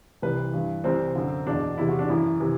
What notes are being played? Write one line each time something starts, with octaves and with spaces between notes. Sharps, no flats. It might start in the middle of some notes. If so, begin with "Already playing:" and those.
C2 C3 E3 B4
G2 E3
C2 C3 E3 C4
F#2 D3
E2 B2 D4
E2 C3 E3 E4
F#4
D4
F#2 E3 E4
C3 E3